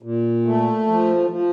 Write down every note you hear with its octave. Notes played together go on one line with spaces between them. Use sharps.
A#2
A3
F3
F3